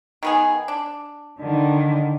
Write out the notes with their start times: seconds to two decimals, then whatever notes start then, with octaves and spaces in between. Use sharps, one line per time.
0.23 D#3 B3 G#4
0.68 D4
1.39 D3 D#3